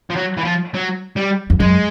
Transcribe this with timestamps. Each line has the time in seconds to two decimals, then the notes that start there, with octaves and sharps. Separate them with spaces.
0.10 F3
0.16 F#3
0.37 E3
0.45 F3
0.74 F#3
1.16 G3
1.50 F2
1.60 F#2 G#3